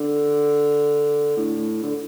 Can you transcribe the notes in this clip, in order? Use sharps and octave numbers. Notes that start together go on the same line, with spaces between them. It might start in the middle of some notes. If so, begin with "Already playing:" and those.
Already playing: D3
A2
D3